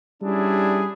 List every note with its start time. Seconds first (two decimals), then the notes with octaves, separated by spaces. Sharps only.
0.22 G3 C#4 D4 E4 G#4